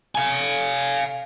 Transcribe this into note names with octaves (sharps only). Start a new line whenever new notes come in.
F5 G#5